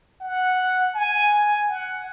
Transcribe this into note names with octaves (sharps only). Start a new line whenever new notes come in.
F#5
G#5
F#5